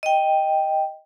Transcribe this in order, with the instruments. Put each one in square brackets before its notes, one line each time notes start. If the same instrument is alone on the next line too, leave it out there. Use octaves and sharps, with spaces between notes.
[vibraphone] D#5 G5